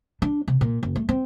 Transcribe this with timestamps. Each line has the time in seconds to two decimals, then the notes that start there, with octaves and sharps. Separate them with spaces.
0.22 D4
0.48 C3
0.61 A#2
0.83 F#1
0.96 A3
1.09 C4